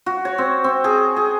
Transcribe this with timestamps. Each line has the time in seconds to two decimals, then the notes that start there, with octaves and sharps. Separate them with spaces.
0.06 F#4
0.25 C#5
0.38 C4
0.64 C4
0.84 G#4
1.16 G#4